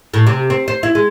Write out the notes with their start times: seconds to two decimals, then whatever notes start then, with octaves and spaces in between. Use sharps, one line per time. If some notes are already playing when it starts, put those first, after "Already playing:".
0.14 A2
0.26 C3
0.50 C4
0.68 C5
0.83 E4
0.95 G#3